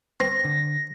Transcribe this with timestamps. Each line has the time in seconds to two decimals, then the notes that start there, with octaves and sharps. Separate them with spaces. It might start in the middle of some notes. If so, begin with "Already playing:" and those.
0.20 C4 A#6
0.44 D3